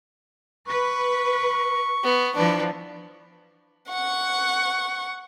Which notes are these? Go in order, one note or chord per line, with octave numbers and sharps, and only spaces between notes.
B4 C#6
B3
E3 F3 D4 B4
F#5 C#6